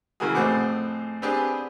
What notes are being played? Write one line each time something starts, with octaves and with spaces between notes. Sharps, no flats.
C#3 E3 F#3 A#3 F#4 G#4
F2 A2 C4 G#4 F#5 D6
B3 C4 D4 G4 G#4